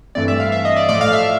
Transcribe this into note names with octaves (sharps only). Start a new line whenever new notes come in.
G2 E3 A3 C4 D5
E5
F5
E5
D#5
D5
A2 F3 A3 D5
F5
E5